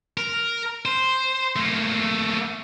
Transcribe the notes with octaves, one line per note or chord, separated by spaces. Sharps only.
A#4
C5
A3 A#3